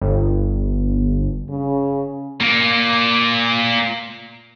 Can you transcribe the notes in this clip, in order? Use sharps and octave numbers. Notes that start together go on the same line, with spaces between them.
G1
C#3
A#2 A#3